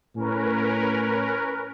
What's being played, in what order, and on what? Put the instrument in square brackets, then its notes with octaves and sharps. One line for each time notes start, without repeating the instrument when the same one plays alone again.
[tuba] A2 [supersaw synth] C#4 A#4 B4